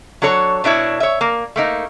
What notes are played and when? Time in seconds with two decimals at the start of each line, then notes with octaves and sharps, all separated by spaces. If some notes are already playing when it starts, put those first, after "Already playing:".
0.22 F#3 D4 A4 C#5
0.64 B2 D4 E4 C#5
1.00 C#5 E5
1.21 A#3
1.56 A3 A#3 D#4